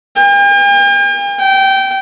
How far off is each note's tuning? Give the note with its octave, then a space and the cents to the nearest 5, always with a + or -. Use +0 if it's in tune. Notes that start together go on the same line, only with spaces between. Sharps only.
G5 +45
G5 -20